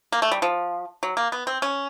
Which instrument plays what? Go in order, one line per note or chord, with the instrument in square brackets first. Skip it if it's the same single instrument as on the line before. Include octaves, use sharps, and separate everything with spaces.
[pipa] A#3
A3
G3
F3
F#3
A#3
B3
C4
C#4